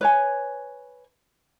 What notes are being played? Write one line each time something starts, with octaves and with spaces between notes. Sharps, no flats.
B4 C#5 G#5